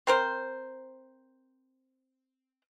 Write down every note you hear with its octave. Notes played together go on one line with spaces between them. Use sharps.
C4 A#4 C5